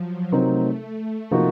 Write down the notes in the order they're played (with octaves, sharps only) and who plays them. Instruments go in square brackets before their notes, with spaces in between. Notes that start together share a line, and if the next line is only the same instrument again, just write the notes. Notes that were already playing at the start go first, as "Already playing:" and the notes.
Already playing: [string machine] F3 F#3
[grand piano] C3 F#3 C4 D#4 A#4 [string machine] A3
[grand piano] C3 F3 A#3 D#4 F#4